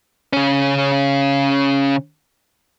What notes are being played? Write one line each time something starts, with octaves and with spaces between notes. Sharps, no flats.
C#3 C#4